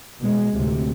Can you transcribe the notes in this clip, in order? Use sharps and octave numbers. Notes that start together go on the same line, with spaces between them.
B2 G#3
D2 A2 C3